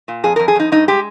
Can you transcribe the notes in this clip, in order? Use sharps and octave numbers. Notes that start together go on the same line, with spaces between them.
A#2
F2 G#4
F2 A#4
G#4
F2 D#4
G2 D#4
G#3 G4